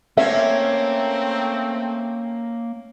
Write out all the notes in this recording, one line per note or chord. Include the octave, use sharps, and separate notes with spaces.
A3 A#3 C4 C#4 E5